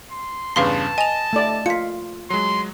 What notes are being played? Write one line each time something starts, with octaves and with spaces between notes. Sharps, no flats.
C6
E2 G2 C#3 B4 F5 A5 C6
D#5 G#5 F7
A3 D5
F4 B6 C#7
F#3 G#3 C6